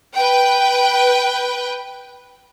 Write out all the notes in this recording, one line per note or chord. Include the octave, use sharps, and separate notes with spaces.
B4 G5